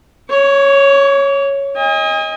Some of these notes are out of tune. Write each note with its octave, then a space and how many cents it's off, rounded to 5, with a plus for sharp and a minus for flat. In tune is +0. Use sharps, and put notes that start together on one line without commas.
C#5 +0 C#6 +45
D#5 +20 G#5 -40